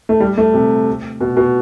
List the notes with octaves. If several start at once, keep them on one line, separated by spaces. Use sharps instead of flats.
A3
G3
A3
C3
B2
B2